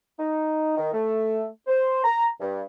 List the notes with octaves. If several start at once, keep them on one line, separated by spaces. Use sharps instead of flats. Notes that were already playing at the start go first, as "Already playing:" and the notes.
D#4
D#3
A3
C5
A#5
G2